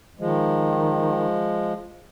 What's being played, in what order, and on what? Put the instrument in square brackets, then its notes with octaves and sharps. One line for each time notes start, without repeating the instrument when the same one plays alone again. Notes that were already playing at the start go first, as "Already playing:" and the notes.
[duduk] D#3 [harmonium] F3 G#3